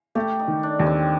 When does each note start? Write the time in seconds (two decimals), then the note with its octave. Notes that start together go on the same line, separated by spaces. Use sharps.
0.15 A3 G4
0.39 D#4
0.48 D#3
0.63 D4
0.80 D#2
0.86 C4